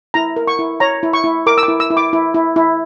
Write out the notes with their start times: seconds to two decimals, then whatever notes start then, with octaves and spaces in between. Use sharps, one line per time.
0.14 E4 A#5
0.36 A#4
0.47 C#6
0.59 E4
0.80 C#5 A#5
1.03 E4
1.13 C#6
1.24 E4
1.47 A#4 D6
1.58 E6
1.63 D6
1.68 E4
1.80 E6
1.90 E4
1.97 D6
2.13 E4
2.34 E4
2.56 E4